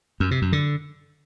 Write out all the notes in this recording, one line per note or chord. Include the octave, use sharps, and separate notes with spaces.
F#2
C3
F#2
D3